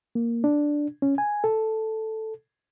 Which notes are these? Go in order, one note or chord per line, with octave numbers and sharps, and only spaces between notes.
A#3
D4
C#4
G#5
A4